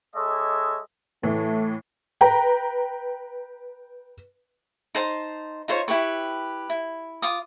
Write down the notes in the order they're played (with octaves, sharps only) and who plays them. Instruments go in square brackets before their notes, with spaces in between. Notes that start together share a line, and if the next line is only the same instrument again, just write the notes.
[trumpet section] G#3 A4 C#5 D#5 E5
[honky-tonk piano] A2 E3 [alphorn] A3
[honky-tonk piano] B4 G5 A#5
[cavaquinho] D#4 C5 A5
D#4 F4 C5 C#5
E4 G4 B4 C#6
E4
F4 D6 D#6